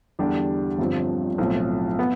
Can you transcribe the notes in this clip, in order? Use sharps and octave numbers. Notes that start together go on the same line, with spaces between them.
E2 D3 G3 D4 G4
G1 G2 F3 C4
B1 A2 F3 C4
B3